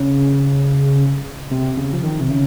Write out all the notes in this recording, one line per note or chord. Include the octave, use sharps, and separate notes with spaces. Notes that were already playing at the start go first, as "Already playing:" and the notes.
Already playing: C#3
C3
C#3
F3
D#3
C3
C#3